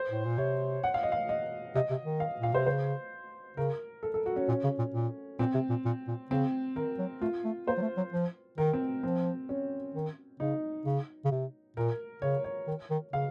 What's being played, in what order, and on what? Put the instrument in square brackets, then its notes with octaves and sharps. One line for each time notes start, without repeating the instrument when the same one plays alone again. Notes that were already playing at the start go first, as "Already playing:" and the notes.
Already playing: [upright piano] C5
[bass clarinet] A2
A#2
[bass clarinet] C3 [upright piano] C#5
[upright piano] F#5
F5
D#5
F5
D#5
[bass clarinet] C3 [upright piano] D#5
[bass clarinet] C3
D#3
[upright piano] F5
[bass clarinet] A#2 [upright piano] F5
[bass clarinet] C3 [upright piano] C5
[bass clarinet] C#3 [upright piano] C5
[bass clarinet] C#3 [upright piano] A#4
[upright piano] A4
A4
F#4
C#4
[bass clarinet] A#2 [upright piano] C#4
[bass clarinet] C#3
A#2
A#2
[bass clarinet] A#2 [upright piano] C4
[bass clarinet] C3
A#2
A#2
A#2
[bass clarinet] C#3 [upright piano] C4
[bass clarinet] D#3 [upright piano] A#4
[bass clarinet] F#3
[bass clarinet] A3 [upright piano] F4
[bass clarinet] A3
[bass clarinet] A#3 [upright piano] C5
[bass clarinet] F#3
A3
F#3
F3
[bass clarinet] D#3 [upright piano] A#4
[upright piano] C4
[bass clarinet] F3 [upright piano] C4
[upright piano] C#4
[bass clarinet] D#3
[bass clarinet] C#3 [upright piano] D#4
[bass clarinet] C#3
C#3
C3
[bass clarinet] A#2 [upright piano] A#4
[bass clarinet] C#3 [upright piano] C#5
[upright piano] C#5
[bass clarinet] D#3
D#3
[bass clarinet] C#3 [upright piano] F5